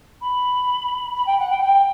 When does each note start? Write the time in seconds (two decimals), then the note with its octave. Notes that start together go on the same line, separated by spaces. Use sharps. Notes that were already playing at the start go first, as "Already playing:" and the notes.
0.21 B5
1.14 B5
1.26 G5
1.38 F#5
1.49 G5
1.62 G5